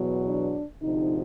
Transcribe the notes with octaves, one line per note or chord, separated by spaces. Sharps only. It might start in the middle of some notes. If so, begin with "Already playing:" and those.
Already playing: E2 B2 F#3
D4
D2 C3 F3 D#4